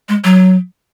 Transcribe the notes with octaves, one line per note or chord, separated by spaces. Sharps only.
G#3
F#3